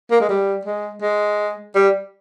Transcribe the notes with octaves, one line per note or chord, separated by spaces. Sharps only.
A#3
G#3
G3
G#3
G#3
G3